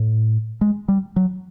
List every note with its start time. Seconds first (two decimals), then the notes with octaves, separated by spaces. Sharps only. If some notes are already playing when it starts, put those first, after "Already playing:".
Already playing: A2
0.61 G#3
0.88 G3
1.16 F#3